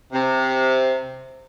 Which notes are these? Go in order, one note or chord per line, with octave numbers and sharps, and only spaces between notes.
C3